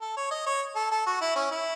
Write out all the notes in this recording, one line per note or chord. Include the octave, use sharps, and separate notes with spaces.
A4
C#5
D#5
C#5
A4
A4
F#4
E4
C#4
E4